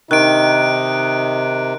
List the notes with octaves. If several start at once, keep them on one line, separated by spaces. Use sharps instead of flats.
C3 D#3 D#4 F#6 D7